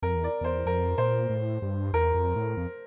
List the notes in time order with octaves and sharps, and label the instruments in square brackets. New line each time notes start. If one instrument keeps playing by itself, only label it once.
[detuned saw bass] F2 [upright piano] A#4
[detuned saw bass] E2
[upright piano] D5
[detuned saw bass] E2 [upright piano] C5
[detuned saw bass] F2 [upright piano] A#4
[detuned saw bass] A#2 [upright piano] C5
[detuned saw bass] A2
G2
[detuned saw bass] E2 [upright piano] A#4
[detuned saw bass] F2
A2
F2